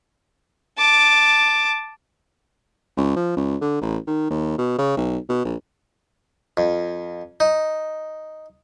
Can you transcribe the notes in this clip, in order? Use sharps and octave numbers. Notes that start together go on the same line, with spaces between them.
A5 D6
C#2
F3
C#2
D3
A1
D#3
D#2
B2
C#3
B1
B2
A#1
F2
D#4